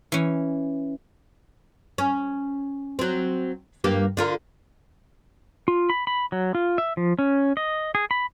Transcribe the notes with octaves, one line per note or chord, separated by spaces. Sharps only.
E3 C#4
C#4
F#3 C4
G2 A#3 G4
D3 F4 A#4
F4
B5
B5
F#3
F4
E5
F3
C#4
D#5
G#4
B5